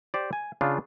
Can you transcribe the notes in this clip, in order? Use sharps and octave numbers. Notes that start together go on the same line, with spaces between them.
G4 C5 D5
G#5
C#3 D4 F4